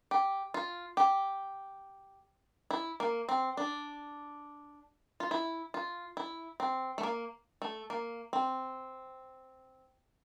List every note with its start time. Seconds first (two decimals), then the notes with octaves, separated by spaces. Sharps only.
0.11 G4
0.54 F4
0.97 G4
2.71 E4
3.00 A#3
3.29 C4
3.57 D4
5.20 F4
5.31 E4
5.74 F4
6.17 E4
6.60 C4
6.98 A3
7.03 A#3
7.62 A3
7.90 A#3
8.33 C4